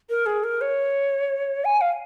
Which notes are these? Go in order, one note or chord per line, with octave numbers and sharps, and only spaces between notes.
A#4
G#4
A#4
C#5
G#5
F5